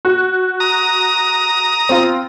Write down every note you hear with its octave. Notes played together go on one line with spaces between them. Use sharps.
F#4
A#5 D#6
C4 F4